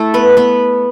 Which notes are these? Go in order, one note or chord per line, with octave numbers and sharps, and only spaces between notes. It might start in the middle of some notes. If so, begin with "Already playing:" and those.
Already playing: A3 E4 A4 E5
B3 B4
B3 B4